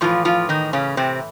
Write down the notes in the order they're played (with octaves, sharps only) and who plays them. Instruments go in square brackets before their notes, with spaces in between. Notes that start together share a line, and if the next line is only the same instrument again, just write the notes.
[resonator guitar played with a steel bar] A2 E3 F3 F4
F3 F4
D#3 D#4
C#3 C#4
C3 C4